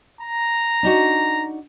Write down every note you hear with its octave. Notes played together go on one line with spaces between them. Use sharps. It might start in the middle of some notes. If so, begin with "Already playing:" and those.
A#5
D4 D#4 F#4